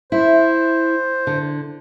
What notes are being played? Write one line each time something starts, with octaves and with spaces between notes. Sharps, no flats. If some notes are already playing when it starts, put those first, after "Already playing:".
E4 C5
D3